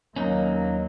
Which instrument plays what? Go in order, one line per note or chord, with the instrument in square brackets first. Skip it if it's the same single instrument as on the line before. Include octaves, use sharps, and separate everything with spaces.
[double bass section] D#2 A#3 [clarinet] F#3 [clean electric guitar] C#4 D#4